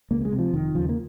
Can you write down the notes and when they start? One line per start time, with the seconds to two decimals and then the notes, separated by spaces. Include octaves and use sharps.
0.11 C#2 A#3
0.21 A#3
0.25 G#3
0.32 C3
0.39 F3
0.53 F1 D#3
0.75 D#2 C#3 F3
0.89 A#3